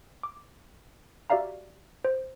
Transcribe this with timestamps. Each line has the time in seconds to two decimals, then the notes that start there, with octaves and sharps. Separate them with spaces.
0.23 D6
1.30 F#4 G4 D5 E5 F5 A#5
2.05 C5